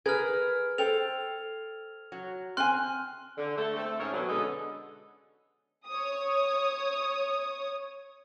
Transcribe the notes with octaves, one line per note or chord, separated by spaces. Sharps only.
G#4 A#4 B4 F6 G#6
A4 C5 G5 F7
F#3
C4 G#5 C6 F6 F#6
D3
A3 A4
A3 C4 A4
G#2 D#3 C#4 G#4 A#4 C#5
B2 D3 F#3
D3 G#3 B3 C#4 A4 D#5
C#5 D#6